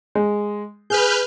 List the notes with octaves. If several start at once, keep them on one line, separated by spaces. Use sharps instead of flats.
G#3
G#4 B4 F6 G6